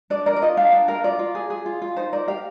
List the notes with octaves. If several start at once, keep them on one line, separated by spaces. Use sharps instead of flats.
D4 D5
A#4 D5
D5
F4 D#5
D4 F5
D4 G5
A#4 F5
F4 D5
F4
G#4
G#4
F4
F4
D#4 C5
A#4 D5
G4 F5